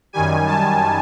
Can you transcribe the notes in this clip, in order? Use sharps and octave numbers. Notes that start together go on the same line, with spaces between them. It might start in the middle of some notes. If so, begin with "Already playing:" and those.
F#2 D#3 G3 G#5
A5